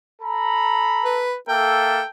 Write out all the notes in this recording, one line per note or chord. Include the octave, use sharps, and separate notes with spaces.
A4 A#5 B5
B4
A#3 A4 E5 G5